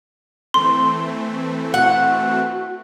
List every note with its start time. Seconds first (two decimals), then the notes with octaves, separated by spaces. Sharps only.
0.54 E3 A3 C4 C6
1.74 F#4 F#5